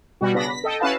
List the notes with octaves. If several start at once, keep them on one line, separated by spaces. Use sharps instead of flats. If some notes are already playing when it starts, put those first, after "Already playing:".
B2 G3 F#4
C#3 B3 D4 B5 A#6
B6
A4 D#5 G5
C#4 E4 F#4 B4 F5 A5